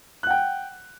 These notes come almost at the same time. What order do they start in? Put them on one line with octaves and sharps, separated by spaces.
F#6 F#5 G5